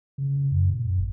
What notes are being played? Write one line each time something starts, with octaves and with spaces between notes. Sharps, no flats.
C#3
C#3
F#2
A#2
F#2
G1